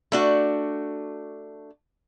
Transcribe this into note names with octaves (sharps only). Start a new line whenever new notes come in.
A3 D4 F#4